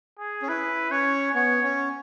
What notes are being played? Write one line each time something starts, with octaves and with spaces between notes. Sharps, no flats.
G#4
C#4
E4 B4
C#4 C#5
B3 C#5
C#4